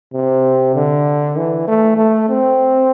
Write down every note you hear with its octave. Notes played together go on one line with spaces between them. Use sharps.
C3
D3
E3
A3
A3
C4